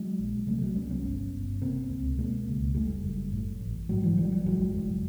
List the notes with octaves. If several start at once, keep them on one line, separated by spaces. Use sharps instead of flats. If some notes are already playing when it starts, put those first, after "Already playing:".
Already playing: F#3 G#3
A#1
C3 G3 A3
F#3 G#3
C2 B3 C#4
B3 C#4
G1
G1
C3 A#3 C4
C#2
B2 G#3 A#3
C#2
F#1 G3 A3
F#1
A2
A1
G#2 F#3 G#3
E3 F#3
A1 F3 G3
F3 G3
F#1 F#3 G#3
F#1